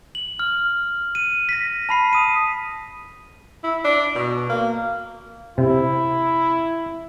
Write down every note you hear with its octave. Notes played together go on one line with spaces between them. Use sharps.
F#7
F6
D#7
A#6 B6
A5 B5 C7
D#6 D#7
E4
D4
B2
A#3
C3 E4